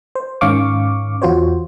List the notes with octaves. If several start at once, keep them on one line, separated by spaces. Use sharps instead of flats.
C5
G#2 D#3 C#4 F5 C#6 D6
E2 F4 F#4 C5 C#5